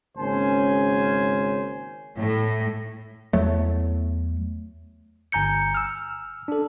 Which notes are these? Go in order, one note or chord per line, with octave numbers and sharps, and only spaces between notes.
G#1 C#3 A#3 C#4 C5 G#5
A2
E2 F#3 A3
G1 G#5 A#5 G6 C#7
E6 F6
D4 A4